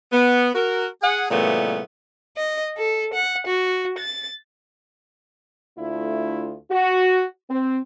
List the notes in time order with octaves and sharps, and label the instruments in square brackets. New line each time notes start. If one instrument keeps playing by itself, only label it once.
[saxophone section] B3
F#4 A#4
G#4 F#5
A#2 C#3 E3 G3 A3 B3
[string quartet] D#5
A4
F#5
F#4
A6
[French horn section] D2 A3 D4 E4 F4
F#4
C4